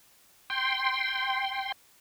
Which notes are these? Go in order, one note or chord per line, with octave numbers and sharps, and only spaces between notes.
G5 C6